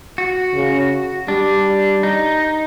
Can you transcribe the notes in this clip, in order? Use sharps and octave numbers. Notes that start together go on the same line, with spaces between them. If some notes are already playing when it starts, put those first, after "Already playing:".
F#4
C#3
G3 D4
D#4